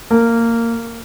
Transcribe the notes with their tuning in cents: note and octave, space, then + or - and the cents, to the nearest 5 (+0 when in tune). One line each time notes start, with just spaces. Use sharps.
A#3 -15